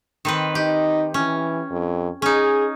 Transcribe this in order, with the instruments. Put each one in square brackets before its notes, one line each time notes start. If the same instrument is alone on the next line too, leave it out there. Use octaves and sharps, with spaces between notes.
[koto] D#3 C4 B4
[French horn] D#4 [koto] G4
[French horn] E3 [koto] C#4
[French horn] F2
[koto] C#4 D#4 [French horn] G#4